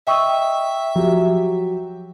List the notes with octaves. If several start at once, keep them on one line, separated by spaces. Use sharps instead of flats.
D#5 E5 G5 C#6 D#6 E6
F3 F#3 G4